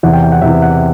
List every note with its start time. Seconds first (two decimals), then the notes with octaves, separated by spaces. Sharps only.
0.03 E2 C3 E3 F#5
0.13 G5
0.24 G5
0.32 F#5
0.42 E2 C3 E3 E5
0.62 F#5